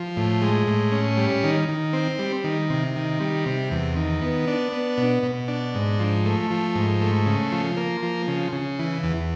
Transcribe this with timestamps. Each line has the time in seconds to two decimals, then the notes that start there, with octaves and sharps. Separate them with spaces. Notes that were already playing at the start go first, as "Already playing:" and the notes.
Already playing: F3
0.17 A2
0.42 G#3
0.67 A2
0.92 C#4
1.17 G3
1.44 D#3
1.69 D#3
1.93 C4
2.19 G3
2.44 D#3
2.70 C3
2.96 D#3
3.20 G3
3.46 C3
3.71 E2
3.96 D#3
4.22 B3
4.48 D4
4.72 B3
4.98 B2
5.23 B2
5.48 D4
5.75 G#2
6.00 F3
6.25 A3
6.51 F3
6.75 G#2
7.01 A3
7.26 C#3
7.51 F3
7.77 A#3
8.03 F3
8.28 C#3
8.53 C#3
8.79 E3
9.03 E2